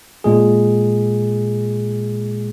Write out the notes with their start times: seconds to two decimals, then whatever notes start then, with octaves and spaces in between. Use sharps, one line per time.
0.24 A#2 G#3 G#4